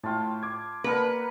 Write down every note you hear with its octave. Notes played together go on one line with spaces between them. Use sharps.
A2 F4 G5 A5
D6 G#6
A#3 B3 D4 A#4 B4